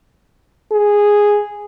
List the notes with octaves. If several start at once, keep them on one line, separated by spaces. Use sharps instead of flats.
G#4